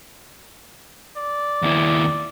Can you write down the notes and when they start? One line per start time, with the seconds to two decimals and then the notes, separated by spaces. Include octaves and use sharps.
1.17 D5
1.62 D#2 E4